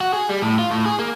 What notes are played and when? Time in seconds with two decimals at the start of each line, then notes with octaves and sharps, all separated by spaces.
0.01 F#4
0.13 G#4
0.29 G3
0.42 A2
0.59 F4
0.71 A2
0.86 G#4
0.99 A#3